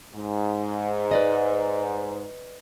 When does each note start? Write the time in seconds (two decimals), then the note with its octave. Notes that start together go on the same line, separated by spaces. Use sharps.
0.15 G#2
1.11 B4 D5 D#5